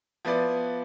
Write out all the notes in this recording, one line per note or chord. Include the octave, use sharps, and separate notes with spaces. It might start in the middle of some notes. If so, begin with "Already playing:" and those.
F3 B3 E4 B4 D5